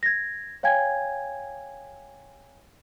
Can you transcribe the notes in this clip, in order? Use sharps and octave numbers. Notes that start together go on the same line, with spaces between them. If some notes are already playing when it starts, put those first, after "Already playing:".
G#6 A#6
C#5 F5 G5 G#5 G#6